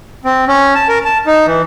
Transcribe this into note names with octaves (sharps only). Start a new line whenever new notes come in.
C4
C#4
A5
A#4
A5
D#4
E3